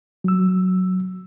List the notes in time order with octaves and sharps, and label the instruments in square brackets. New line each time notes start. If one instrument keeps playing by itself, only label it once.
[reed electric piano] F#3 E6